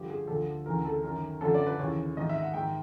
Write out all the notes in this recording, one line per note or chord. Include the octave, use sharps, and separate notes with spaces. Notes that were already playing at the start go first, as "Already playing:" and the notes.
Already playing: G2 D3 F3 G4
G#4
D2 D3 F3 A4
D2 C#3 E3 A#4
A4
F#2 D#3 A#4
F#2 D3 F3 A4
D5
B4
D#2 C#3 E3 C#5
G#2 D#3 D#5
E5
F#5
G#2 D#3 G5